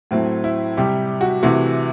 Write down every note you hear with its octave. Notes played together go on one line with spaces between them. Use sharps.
A2 F#3 A3 C4
E4
C3 G3 G4
F#4
C3 E3 A3 F#4